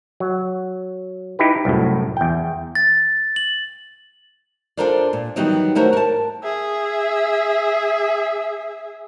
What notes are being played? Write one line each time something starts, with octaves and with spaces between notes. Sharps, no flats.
F#3
D#4 E4 G4 B4
C2 F#2 A2
E2 G5
A6
F#7
D4 F4 A4 A#4 C5 D5
A#2
D#3 E3 F#3 G3 B3 D#4
A3 E4 F#4 A#4 C5 C#5
A#4 A5
G#4 E5